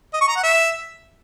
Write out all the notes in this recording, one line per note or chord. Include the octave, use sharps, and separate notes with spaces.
D#5
C#6
A#5
F#5
E5